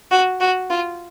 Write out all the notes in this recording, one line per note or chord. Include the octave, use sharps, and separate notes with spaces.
F#4
F#4
F4